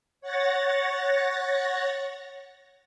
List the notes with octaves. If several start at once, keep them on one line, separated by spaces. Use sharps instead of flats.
C#5 F#5 A6 A#6